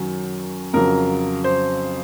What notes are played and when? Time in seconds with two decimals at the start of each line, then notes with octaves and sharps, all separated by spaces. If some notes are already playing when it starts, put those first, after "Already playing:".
Already playing: F#2 D#3 F#3
0.74 F2 C#3 F#3 A#4
1.44 C5